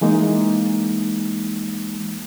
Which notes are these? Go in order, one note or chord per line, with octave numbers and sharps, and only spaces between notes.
E3 G#3 A#3 D#4